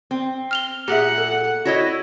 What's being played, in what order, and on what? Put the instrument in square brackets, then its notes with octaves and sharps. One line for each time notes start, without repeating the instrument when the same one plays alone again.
[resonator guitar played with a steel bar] C4
[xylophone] F6 F7 G7
[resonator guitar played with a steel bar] A#2 [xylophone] G4 G#4 E5 [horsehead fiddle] F#5
[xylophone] A4
[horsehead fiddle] E4 [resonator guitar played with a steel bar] F#4 C#5 D#5